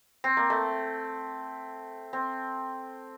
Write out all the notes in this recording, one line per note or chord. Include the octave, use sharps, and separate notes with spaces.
C4
A#3
A3
C4